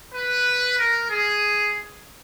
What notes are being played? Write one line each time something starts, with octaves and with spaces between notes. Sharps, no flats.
B4
A#4
G#4